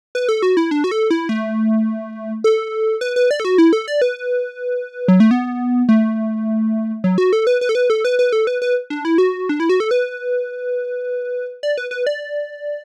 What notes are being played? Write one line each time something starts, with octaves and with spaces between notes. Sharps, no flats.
B4
A4
F#4
E4
D4
F#4
A4
E4
A3
A4
B4
B4
D5
A4
F#4
E4
A4
D5
B4
F#3
A3
B3
A3
F#3
F#4
A4
B4
B4
A4
B4
A4
B4
B4
A4
B4
B4
D4
E4
F#4
D4
E4
F#4
A4
B4
D5
B4
B4
D5